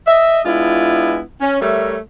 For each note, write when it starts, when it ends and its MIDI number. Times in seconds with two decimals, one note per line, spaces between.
0.07 0.39 75
0.07 0.39 76
0.45 1.20 56
0.45 1.20 59
0.45 1.20 62
0.45 1.20 64
0.45 1.20 65
1.40 1.56 61
1.61 1.96 55
1.61 1.96 57
1.61 1.96 70
1.61 1.96 73
1.61 1.96 76